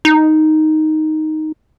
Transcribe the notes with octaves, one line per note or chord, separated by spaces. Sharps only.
D#4